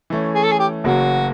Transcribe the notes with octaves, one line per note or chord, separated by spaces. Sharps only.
E3 A3 C#4
G#4
A4
G#4
G4
F#1 F#2 C#3 F#3 A#3 F#4